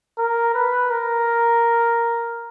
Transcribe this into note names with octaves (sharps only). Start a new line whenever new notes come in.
A#4
B4
A#4